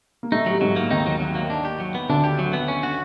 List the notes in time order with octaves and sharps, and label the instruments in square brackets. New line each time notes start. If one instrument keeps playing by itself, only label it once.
[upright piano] A#3
[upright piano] A2 A3 [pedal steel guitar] D#4
[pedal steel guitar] F#3 [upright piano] G3
[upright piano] G#2 G#3 [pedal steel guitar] F#3
[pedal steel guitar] A#3
[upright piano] D#2 D#3 [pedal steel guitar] D#4
[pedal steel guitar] F#3
F#3
A#3
D4
G4
F#3
B3
[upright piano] D2 D3 [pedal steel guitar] D4
[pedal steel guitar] G4
F#3
B3
C#4
F#4